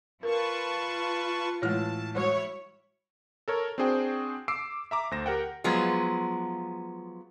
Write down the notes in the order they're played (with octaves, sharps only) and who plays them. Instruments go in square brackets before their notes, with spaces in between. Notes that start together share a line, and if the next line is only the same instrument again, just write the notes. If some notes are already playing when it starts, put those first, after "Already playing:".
[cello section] F4 [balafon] A#4 [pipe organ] B4 A5 C#6
[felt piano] A2 E3 F6 [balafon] G#3 C#5 [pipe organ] A5
[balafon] G3 G#3 F#4 [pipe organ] E4 [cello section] C#5
[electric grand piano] A4 A#4 C#5
C4 D4 F#4 G#4 C5 G5
D6 E6 C7 D7
E5 A#5 D6
D2 C5 A#6 E7
G4 A#4 F#5 G5
[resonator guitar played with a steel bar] F3 F#3 G#3 B3 F4